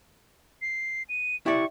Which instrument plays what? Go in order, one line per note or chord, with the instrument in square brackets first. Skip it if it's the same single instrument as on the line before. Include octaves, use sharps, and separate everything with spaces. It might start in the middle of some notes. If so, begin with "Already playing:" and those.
[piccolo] C7
D#7
[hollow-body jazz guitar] E4 G4 D5 [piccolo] C#6